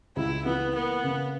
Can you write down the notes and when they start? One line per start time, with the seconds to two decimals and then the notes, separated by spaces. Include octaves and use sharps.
0.16 C#2 E4
0.45 E3 B3
0.75 A#3 B3
1.04 C#3